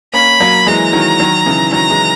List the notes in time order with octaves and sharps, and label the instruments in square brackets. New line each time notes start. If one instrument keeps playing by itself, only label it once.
[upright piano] A#3 C#4 [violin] B5
[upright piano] F#3 A#3
[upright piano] E3 G#3 [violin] A#5
[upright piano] D#3 F#3
D#3 F#3
C#3 E3
[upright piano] D#3 F#3 [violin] A#5
[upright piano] E3 G#3